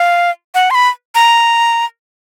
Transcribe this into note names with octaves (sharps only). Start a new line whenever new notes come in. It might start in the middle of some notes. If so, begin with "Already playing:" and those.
Already playing: F5
F#5
C6
B5
A#5